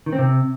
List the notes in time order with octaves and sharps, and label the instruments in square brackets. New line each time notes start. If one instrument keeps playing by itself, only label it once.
[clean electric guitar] D#3
C4
C3